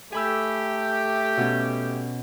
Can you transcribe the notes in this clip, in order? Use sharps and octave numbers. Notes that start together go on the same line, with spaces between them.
A3 G4 G#5 B5 E6
B2 C#4